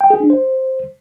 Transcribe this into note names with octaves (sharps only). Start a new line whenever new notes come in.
G5
G#4
D4
C5